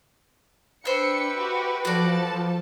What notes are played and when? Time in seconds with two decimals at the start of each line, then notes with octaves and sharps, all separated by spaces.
0.85 D4 B4 C5 E5 G5 C#7
1.38 F#4 G4
1.85 F3 F#4 A4 D5 A5